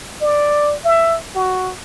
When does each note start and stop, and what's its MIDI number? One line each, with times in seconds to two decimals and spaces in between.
0.21 0.76 74
0.85 1.17 76
1.35 1.71 66